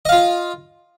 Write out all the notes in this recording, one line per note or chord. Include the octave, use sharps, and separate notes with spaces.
F4 D#5 F5